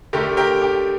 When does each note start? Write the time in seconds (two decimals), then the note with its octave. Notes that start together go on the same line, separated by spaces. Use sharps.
0.13 D3 A3 G4 A#4
0.37 G4 A#4
0.62 G4